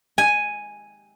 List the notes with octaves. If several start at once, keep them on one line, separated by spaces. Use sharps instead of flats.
G#5